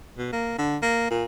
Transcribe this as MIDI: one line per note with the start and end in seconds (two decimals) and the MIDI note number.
0.18 0.31 47
0.33 0.54 58
0.58 0.77 50
0.82 1.06 58
1.10 1.24 46